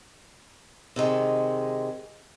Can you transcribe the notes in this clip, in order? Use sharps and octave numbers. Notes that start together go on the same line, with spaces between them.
C3 D#3 G#3